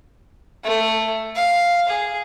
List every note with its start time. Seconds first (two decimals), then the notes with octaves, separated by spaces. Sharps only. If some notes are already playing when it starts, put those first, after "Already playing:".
0.64 A3
1.36 F5
1.88 G#4